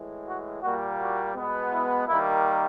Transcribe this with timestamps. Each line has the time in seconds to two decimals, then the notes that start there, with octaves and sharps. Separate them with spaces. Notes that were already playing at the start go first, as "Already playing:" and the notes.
Already playing: A2 E3 G#3
0.26 F#4
0.62 A#2 G3 A#3 F#4
0.99 F#4
1.35 B2 G#3 B3
1.71 E4
2.07 D#3 G3 A#3 E4